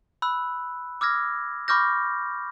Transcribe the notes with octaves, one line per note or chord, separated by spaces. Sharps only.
B5 E6 F#6
D6 E6 F6 G#6 A#6
B5 C#6 D6 F6 G6 A#6